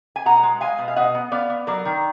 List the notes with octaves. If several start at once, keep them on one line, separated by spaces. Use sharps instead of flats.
G#5
B2 F#5 A#5
G#3
G#3 F5 G#5
B2
F5
B2 D#5 F#5
B3
B3 D5 F5
B3
F#3 A#4 D5
D#3